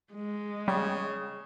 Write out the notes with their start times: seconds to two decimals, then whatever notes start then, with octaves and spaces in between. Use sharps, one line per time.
0.13 G#3
0.68 C#3 G3